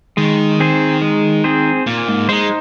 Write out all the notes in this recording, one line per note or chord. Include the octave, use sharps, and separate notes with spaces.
D#3 G#3
C4 G#4 C5
G#3
C4 G#4 C5
A#2 A#3
G#2
G#3 D#4 C5